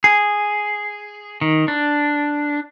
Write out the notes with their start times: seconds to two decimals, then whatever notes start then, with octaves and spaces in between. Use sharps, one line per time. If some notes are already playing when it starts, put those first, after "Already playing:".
0.04 G#4
1.41 D#3
1.68 D4